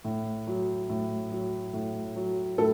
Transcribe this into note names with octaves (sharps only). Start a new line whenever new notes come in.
A2
F#3
A2
F#3
A2
F#3
A2 A4